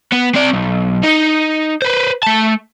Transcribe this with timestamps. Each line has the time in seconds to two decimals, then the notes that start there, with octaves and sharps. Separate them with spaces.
0.12 B3
0.34 C4 D5
0.53 B1
1.03 D#4
1.82 B4 C5
2.23 A3 A5